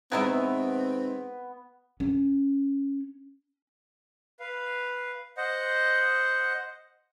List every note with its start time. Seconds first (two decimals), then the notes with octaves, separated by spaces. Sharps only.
0.12 B2 D#3 G#3 B3 C4 E4 A#4 E5
2.00 C#4
4.40 B4 F5
5.37 C5 D#5 F#5